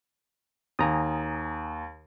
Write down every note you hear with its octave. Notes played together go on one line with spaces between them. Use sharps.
D#2 G#5 A#5 D#6